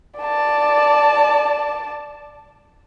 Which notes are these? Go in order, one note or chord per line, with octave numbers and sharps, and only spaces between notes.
D5 A5